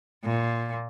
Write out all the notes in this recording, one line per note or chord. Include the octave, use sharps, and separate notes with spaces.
A#2